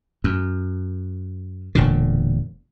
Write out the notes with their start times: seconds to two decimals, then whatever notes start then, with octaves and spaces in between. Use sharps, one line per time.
0.24 F#2
1.75 E1 A#2 D3